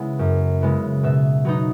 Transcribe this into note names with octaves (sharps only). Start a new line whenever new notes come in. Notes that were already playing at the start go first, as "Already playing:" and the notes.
Already playing: C#3 G#3 B3 E4 F#5
F#2
C#3 G#3 B3 E4
B2 E5
F#3 B3 D#4